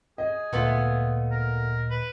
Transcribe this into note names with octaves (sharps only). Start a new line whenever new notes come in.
G#4 D#5
D2 A#2 A3 B3 F4
A#4
B4